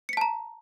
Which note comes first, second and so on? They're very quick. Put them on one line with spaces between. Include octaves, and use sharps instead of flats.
C#7 B6 A5 A#5